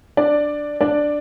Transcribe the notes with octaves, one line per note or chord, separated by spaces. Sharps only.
D4 D5
D4 D5